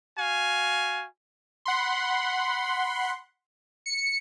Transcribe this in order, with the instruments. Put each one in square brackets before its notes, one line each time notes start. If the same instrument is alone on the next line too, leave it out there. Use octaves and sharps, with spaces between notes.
[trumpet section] F#4 F5 G#5
[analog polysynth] F#5 B5 C6
[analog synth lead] C#7